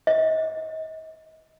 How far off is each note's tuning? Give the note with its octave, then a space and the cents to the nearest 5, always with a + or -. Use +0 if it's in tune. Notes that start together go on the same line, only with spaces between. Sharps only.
D#5 +35